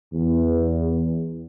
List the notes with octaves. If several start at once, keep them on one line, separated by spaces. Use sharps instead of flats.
E2